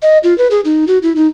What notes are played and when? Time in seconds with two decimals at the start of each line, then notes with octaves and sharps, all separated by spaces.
0.02 D#5
0.23 F4
0.38 B4
0.51 G#4
0.65 D#4
0.87 F#4
1.03 E4
1.16 D#4